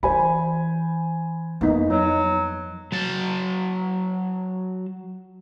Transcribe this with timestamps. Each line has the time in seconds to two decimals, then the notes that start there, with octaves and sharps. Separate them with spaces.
0.03 E3 C5 G#5 B5
1.61 F2 A#3 B3 D#4
1.90 F#3 D#4
2.92 F#3 A5